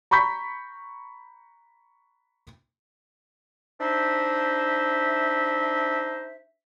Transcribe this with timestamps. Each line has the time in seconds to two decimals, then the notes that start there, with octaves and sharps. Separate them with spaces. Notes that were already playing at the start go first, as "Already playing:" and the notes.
0.11 A#5 B5 C#6 G6 B6
3.80 D4 D#4 C5 E5